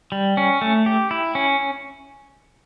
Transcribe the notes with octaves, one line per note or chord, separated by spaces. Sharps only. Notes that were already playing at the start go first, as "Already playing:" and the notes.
G3
C#4
A3
G4
E4
C#4